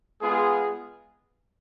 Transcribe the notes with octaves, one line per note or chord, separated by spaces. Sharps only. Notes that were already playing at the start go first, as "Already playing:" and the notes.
G#3 B3 F4 G#4